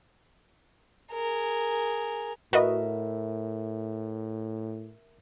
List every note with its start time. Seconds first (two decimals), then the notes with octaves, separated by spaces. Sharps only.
1.12 G#4 A#4
2.53 A2 F#4 A#4 B4 D#5 E5